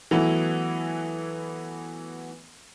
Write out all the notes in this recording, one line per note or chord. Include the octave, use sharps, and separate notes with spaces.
E3 F#3 A3 B3 E4